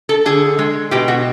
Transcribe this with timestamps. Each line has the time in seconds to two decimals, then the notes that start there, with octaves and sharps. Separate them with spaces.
0.09 A4
0.26 D3 G#4
0.59 G#3
0.91 B2 G4
1.08 F#4